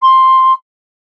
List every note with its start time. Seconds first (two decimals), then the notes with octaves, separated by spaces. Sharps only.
0.02 C6